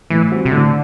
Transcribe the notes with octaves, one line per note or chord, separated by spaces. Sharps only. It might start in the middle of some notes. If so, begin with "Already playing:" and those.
A2 E3
G3 C4 F#4
C3
A2 D3